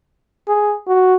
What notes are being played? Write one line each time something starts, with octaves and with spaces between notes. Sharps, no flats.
G#4
F#4